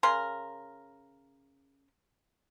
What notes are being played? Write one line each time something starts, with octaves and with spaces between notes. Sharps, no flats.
C#3 A#4 C6